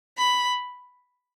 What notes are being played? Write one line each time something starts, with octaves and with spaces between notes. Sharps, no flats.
B5